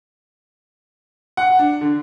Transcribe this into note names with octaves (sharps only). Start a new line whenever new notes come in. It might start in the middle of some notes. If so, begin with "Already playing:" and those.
F#5
D4
D3